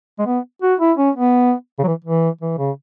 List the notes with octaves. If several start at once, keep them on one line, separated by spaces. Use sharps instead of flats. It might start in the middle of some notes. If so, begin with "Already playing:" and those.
G#3
B3
F#4
E4
C#4
B3
C#3
F#3
E3
E3
E3
C#3